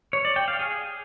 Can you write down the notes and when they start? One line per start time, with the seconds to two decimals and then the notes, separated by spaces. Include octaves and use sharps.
0.13 C#5
0.25 D5
0.36 G5
0.48 F5
0.59 G#4